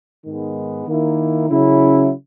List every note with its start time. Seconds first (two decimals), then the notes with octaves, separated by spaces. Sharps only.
0.24 G#2 D#3 G#3 B3
0.86 D#3 A#3 E4
1.48 C#3 F#3 C#4 E4